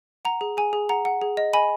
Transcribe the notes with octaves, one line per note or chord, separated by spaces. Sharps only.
F#5 A#5
G#4
G#4 G#5
G#4
F#5 A#5
F#5
G#4
D#5
D#5 G#5 B5